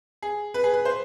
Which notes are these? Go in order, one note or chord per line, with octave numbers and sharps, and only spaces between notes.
G#4
B4
G#4
B4
C5